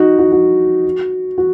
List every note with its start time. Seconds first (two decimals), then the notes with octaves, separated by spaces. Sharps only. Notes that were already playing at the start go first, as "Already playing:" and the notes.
Already playing: D#4 F#4
0.19 F#4
0.32 F#4
1.38 F#4